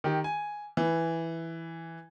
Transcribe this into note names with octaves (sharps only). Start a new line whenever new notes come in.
D#3 G4
G#5
E3